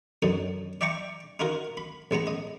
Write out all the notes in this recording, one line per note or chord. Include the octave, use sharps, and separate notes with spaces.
F#2 D3 F#3 D#4
D5 E5 G5 A#5 C#6 D6
D#4 F4 F#4 A#4
B5
A1 G#3 B3 A#5
D#5